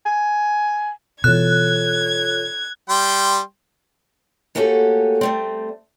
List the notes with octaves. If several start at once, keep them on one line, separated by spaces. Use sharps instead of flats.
G#5
B2 E3 F4 A4 C#5 F#6 G#6
G3 G5 C6
A3 A#3 C#4 F#4 G4 A4
G3 A3 C4